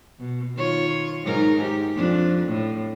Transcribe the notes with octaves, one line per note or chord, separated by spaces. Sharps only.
B2
D#3 F4 C#5
G#2 D#4 A#4
G4
F2 D4
A2